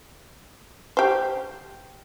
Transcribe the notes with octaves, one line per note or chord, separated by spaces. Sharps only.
G4 C5